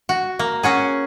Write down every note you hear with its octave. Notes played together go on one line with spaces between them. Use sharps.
F#4
A#3
C#4 F#4 G#4